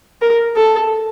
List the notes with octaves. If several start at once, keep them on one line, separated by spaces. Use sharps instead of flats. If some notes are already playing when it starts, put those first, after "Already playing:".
A#4
A4